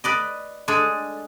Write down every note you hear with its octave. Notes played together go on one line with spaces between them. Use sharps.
B4 D5 D#5
G#3 D4 G#4 A4